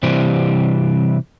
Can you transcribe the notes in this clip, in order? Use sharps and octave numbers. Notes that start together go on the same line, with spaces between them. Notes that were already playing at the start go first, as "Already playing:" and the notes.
C3 E3 G3 C4